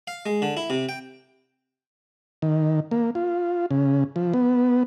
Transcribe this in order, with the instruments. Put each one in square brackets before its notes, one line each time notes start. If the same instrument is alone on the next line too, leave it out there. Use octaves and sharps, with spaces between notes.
[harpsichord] F5
G#3
D3
E4
C3
G5
[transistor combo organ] D#3
A#3
F4
C#3
F3
B3